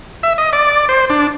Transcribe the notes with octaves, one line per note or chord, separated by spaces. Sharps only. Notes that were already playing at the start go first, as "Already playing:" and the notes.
E5
D#5
D5
C5
D4